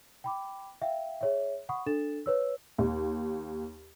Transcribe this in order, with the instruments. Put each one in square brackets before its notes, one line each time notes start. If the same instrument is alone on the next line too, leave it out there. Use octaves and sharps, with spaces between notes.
[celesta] G5 B5 D6
E5 F5 G5
G#4 C#5 E5
F#5 B5 C#6 D#6
D4 A4 A6 E7
B4 C#5 E6
[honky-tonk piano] D#2